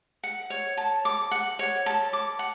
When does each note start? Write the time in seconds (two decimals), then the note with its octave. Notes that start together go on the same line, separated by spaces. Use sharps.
0.23 F#5
0.50 C#5
0.77 A5
1.05 D6
1.31 F#5
1.59 C#5
1.86 A5
2.13 D6
2.39 F#5